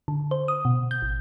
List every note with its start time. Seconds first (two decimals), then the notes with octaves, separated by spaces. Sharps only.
0.08 D3
0.31 C5
0.48 D#6
0.65 B2
0.91 G6
1.02 A1